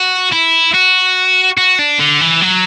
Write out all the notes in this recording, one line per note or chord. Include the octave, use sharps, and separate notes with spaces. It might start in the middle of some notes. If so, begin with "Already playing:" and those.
Already playing: F#4
E4
F#4
F#4
D4
D3
E3
F#3